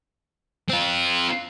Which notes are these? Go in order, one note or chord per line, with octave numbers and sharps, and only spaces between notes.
C4 F4